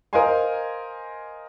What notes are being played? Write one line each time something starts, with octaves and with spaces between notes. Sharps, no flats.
A#4 C5 D#5 F5 G#5 C6